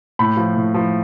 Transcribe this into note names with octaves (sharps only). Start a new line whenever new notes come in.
A2 B5
F3
A2
F3